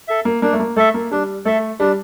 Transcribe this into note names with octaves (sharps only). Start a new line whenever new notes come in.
A4 E5
A#3
A#3 D4
A3
A#3
A3 A4 E5
A#3
G3 D4
A3 A4 E5
G3 D4